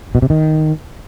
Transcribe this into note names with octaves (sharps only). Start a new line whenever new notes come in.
B2
C3
D#3